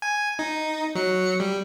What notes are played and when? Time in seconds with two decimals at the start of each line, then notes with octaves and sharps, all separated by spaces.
0.02 G#5
0.39 D#4
0.95 F#3 C#7
1.40 G3